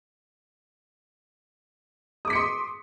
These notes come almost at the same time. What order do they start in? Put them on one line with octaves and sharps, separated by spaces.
D#6 D6 B6 C#7 C6